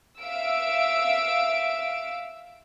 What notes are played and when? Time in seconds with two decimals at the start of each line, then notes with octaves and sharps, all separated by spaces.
0.21 E5 F5 E6 D7